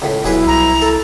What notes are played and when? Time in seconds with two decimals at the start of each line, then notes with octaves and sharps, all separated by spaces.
0.02 C#2 A2
0.24 D#1 B1 E4 G#4 B4
0.47 C2 A#5
0.82 A4